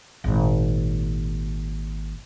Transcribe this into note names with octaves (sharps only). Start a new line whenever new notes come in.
G#1 A#2